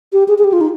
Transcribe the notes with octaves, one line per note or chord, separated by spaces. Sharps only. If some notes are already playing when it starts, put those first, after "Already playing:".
G4
G#4
G#4
G4
F4
D#4